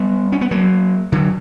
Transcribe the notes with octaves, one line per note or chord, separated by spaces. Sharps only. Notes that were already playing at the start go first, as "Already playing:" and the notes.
Already playing: G3 B3
C#4
B3
F#3 A#3
D3 F#3